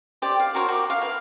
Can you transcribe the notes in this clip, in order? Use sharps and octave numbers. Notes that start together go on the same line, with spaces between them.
G4 C5 D5
F5
F#4 A#4 C5 C#5
F#4 D6
F5
B4 F5